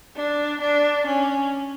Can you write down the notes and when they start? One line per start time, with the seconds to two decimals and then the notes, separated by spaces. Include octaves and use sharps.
0.16 D4
0.61 D4
1.07 C#4